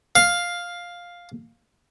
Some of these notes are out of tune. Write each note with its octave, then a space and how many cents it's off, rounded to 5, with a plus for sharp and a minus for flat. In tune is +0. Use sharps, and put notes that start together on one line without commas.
F5 +5